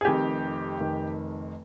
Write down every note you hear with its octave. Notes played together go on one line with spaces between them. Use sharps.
G#4
F1 F2 D#3 G4
F1 F2 D#3